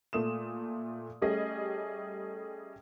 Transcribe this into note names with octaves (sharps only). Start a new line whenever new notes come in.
A#2 A3 D#6 E7
G3 A3 C#4 G4 G#4 D#5